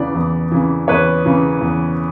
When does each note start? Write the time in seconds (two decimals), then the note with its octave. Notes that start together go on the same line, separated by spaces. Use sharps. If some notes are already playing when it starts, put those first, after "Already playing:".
Already playing: E2 C#3 E3 D5
0.15 E2
0.52 C#3 E3
0.88 E2 B4 C#5
1.25 C#3 E3
1.61 E2